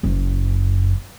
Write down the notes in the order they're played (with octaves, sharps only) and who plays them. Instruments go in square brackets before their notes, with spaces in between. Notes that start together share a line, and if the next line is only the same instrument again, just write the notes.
[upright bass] F#1